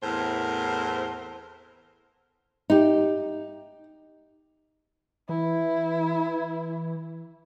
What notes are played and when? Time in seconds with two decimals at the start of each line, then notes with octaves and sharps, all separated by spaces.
0.03 E2 A2 C4 A#4 C5
2.70 D#4 G4
5.29 E3 E4